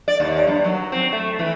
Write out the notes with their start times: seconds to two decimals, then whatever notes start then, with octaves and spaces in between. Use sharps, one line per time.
0.08 D5
0.20 D#2
0.47 G2
0.64 F#3
0.92 C4
1.12 A3
1.39 E3